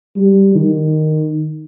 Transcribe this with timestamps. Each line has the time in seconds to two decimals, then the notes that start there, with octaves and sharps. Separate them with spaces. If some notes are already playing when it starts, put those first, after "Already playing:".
0.16 G3
0.55 D#3